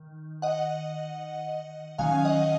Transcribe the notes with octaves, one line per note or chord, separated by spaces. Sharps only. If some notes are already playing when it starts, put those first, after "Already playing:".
Already playing: D#3
D#5 F#5
D#3 F#3 C#4 F5 G#5
D#5 F#5